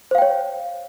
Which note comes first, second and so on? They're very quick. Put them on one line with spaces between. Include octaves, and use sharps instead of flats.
C5 F5 G5 C#5